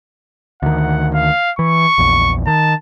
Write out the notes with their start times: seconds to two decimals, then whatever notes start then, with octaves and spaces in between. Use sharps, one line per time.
0.62 D2 D#3 F#5
1.14 F5
1.59 E3 C#6
1.98 A#1 E2
2.47 D#3 A5